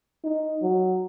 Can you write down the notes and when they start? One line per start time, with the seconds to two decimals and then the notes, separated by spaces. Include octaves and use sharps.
0.24 D#4
0.62 F#3